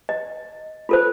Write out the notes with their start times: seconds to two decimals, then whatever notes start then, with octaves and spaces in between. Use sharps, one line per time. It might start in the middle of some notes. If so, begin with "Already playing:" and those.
0.09 D#5
0.89 F4 A4 C5